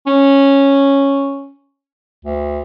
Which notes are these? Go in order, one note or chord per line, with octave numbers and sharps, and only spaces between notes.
C#4
D2